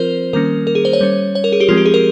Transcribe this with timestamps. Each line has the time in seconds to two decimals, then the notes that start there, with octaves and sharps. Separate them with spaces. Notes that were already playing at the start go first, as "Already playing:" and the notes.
Already playing: F3 C4 F4 A#4 C5
0.33 D#3 G3 A#3 C#4 A#4
0.67 A#4
0.75 G#4
0.85 C5
0.93 C#5
1.01 G3 C#4
1.35 C#5
1.44 A#4
1.52 G#4
1.60 G4
1.69 F3 G#3 C4 F4
1.77 G4
1.86 G#4
1.94 A#4